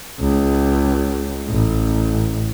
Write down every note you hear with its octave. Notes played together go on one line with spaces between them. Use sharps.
C#2
A1